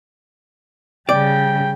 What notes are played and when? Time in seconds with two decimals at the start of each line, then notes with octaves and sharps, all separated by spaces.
1.09 C#3 G3 D5 G5